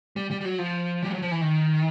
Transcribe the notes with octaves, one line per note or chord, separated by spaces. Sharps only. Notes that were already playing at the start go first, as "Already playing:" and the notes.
G3
G3
G3
F#3
F3
G3
F#3
F3
E3
D#3